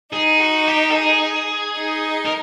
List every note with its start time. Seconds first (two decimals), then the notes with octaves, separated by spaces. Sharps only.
0.13 D#4 G#4
0.40 F#4
0.68 G4
0.90 A4
0.95 G#4
1.78 D#4
2.26 A#4